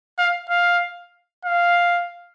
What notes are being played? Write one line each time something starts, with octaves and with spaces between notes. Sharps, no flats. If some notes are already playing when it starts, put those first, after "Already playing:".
F5
F5
F5